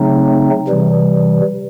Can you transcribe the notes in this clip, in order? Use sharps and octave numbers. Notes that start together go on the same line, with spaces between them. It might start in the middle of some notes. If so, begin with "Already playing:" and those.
Already playing: C#3 F#3 A3 C4 D#4
C3 E3 G3